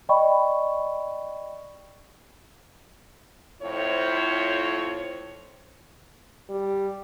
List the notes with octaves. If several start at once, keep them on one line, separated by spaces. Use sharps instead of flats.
D5 D#5 G5 B5 C#6
F2 A2 E4 F4 C5 C#5
G3